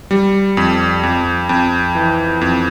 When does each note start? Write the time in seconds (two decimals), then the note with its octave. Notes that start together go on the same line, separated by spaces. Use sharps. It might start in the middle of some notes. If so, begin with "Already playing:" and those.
0.11 G3
0.57 F2
1.03 F2
1.49 F2
1.95 E3
2.41 F2